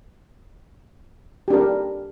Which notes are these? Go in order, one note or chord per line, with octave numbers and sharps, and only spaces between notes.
D4 G4 A#4